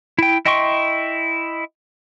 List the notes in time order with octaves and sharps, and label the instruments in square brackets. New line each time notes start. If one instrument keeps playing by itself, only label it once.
[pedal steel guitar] E4 G5
E4 D#5 G5 C6 C#6